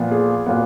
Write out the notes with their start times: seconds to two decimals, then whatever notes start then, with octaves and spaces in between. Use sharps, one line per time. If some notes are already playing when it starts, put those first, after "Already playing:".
Already playing: A#2 F3 B3
0.11 G#4
0.46 A#2 F#3 B3